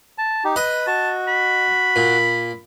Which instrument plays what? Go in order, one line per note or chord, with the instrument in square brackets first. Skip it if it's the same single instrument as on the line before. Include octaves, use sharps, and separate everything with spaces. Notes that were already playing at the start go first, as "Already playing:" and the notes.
[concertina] A5
D#4 G4
[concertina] B4 B5 [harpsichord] D#5
[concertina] F#4 [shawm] A5
[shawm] B5
[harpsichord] A#2